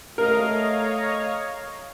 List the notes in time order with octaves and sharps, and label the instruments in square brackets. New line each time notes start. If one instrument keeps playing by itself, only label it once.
[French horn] A3 [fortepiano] A#4 [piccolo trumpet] C#5 [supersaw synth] D#5 F5 A#5